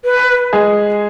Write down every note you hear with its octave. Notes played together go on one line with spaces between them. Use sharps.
B4
G#3 G#4